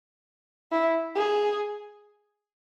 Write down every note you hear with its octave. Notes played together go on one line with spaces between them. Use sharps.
E4
G#4